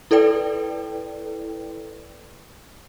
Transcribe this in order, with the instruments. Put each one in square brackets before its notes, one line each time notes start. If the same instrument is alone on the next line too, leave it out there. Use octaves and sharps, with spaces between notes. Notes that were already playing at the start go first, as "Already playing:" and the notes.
[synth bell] E4 A4 B4 D5 G5